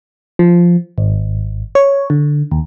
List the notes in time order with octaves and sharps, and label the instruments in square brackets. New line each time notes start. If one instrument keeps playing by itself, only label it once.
[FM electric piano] F3
G#1
C#5
D3
D#2